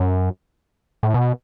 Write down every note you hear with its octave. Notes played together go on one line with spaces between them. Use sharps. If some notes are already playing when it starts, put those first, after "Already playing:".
Already playing: F#2
A2
B2